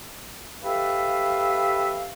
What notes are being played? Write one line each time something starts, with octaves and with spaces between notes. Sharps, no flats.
G4 A4 B4 E5 F5